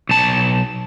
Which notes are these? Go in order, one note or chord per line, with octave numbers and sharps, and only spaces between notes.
B1 A5